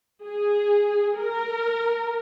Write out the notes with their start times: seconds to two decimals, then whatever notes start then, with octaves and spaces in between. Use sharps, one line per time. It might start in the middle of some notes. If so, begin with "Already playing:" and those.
0.24 G#4
1.19 A#4